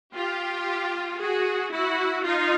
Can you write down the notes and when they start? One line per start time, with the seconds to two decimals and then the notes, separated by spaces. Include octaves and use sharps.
0.14 F4 G4
1.20 F#4 G#4
1.72 E4 F#4
2.25 D#4 F4